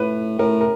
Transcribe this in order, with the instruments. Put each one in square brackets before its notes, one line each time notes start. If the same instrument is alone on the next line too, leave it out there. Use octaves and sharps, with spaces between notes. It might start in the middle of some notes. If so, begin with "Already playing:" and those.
Already playing: [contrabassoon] A2 [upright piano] B4
[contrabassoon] A2 [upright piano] A#4
[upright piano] A#4